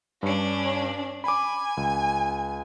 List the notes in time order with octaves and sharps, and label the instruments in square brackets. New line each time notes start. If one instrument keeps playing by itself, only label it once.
[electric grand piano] G2 [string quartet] C#4 D4
[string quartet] G#5 [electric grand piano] B5 D6
[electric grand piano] C#2